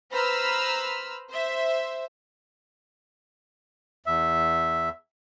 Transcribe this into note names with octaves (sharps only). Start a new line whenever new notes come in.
B4 C5 A#5 B5 E6 F6
C5 E5
E2 E5